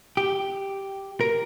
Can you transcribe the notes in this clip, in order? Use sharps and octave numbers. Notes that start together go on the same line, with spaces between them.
G4
A#4